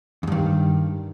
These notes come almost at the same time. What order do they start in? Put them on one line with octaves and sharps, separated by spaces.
E2 G2 D#3